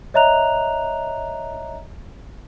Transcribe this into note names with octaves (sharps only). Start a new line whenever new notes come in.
C#5 D#5 E5 A#5 F#6 F7